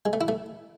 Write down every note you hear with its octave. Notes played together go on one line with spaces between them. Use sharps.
G#3
A3
E4
A3